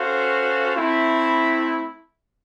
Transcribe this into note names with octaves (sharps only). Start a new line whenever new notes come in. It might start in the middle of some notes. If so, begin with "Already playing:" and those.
Already playing: C#4 F#4 A4 C5 F5
A3 C4 E4